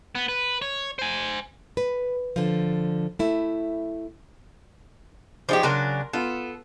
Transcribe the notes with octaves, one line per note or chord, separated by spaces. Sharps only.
B3
B4
C#5
C5 G#5
B4
D3 F3
A3 E4
F3 D4 D#4 G4 G#4 D5
C#3 F#3 D4 A#4 C6
B3 F4 A4